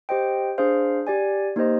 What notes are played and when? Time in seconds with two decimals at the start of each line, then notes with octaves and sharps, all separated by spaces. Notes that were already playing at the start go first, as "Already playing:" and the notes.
0.09 G4 C5 D#5 G5
0.58 D4 G#4 C5 F5
1.07 G4 D5 G#5
1.56 A#3 D#4 G4 C5 D#5